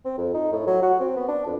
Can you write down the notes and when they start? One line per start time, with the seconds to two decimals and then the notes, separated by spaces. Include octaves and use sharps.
0.05 C4
0.18 F2
0.34 D#4
0.52 A2
0.67 F#3
0.82 F#4
1.00 C4
1.16 B3
1.28 D4
1.46 F2